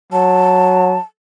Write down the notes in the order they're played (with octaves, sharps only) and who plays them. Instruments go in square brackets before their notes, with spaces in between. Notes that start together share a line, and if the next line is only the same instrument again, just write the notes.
[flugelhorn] F#3 [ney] A5